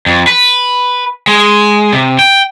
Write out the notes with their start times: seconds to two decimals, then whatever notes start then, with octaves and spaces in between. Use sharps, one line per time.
0.06 F2
0.27 B4
1.27 G#3
1.93 C3
2.19 G5